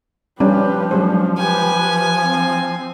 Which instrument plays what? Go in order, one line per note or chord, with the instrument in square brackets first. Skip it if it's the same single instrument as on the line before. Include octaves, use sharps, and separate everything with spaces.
[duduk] F3 [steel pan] G3 C#4 D4 [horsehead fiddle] G4 B4
[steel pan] F#3 G#3 C5 [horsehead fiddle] C#4 D4
[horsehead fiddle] G4 B4 [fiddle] G#5
[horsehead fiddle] C4